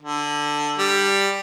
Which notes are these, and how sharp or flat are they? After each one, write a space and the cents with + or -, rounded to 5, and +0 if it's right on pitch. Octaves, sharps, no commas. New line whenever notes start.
D3 +5
G3 +5